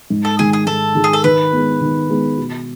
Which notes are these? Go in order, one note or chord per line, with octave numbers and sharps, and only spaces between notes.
G#2
A4
D#3 G#3 G#4
G#4
G#2 A4
D#3 G#3
G#4
A4
D#3 B4
G#3 B3
D#3
G#3 B3
B2